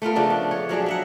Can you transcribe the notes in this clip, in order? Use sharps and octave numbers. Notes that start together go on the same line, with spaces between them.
A3 B3 F4 A#4
C#3 F3 D4 A4
D4
C#5
F3 F#3 D4 G#4
F#3 E5 F#5